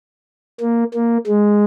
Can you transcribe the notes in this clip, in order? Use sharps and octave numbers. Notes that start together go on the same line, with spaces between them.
A#3
A#3
G#3